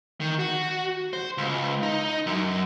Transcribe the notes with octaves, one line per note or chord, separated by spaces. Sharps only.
D#3
F#4
C5
C#2
D#4
F#2